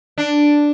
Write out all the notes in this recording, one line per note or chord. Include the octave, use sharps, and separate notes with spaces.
D4